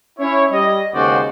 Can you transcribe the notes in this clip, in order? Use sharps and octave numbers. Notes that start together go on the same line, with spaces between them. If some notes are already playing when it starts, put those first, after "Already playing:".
C#4 E4 C#5
G3 D#5
D#2 C#3 G#3 F#4 C5 D5